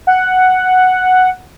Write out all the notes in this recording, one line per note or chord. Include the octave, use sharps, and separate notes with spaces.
F#5